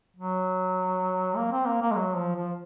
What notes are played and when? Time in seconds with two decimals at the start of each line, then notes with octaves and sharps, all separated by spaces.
0.17 F#3
1.37 A#3
1.52 C4
1.66 A#3
1.81 A#3
1.92 G#3
1.96 F#3
2.16 F3
2.36 F3